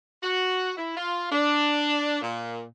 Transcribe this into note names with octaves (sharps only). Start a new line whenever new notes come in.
F#4
E4
F4
D4
A#2